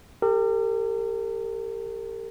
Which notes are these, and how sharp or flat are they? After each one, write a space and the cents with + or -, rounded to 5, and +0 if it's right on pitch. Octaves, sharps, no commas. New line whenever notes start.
G4 +20 A#4 -40